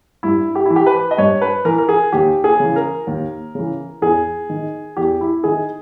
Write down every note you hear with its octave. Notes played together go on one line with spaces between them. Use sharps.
G2 E4
G4
E3 E4
G4
B4
D#5
G2 C#5
B4
E3 A#4
A#4
G#4
D#2 G4
G#4
C#3 E3
A#4
D#2
C#3 E3
E2 G#4
D#3
E2 G4
E4
D#3 G#4